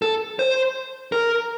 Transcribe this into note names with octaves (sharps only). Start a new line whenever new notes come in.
A4
C5
A#4